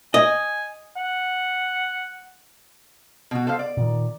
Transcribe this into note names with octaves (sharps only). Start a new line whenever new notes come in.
D#5 G#5
F#5
B2 F#4
A4 C5 F5
D5
A#2 D#3